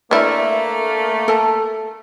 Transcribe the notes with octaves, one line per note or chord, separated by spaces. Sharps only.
A3 A#3 D4 E4 B4 D5 E5
A4 A5